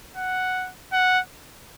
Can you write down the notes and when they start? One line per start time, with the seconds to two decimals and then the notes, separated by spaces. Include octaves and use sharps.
0.17 F#5
0.93 F#5